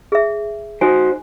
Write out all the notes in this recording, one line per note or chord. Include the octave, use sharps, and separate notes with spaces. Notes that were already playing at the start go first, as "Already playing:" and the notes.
G#4 E5
D#4 F#4 C5 G#5